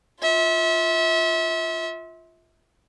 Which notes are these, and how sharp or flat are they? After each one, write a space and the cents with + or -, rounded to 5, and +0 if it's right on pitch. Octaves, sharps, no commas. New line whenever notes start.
F4 +0 E5 -30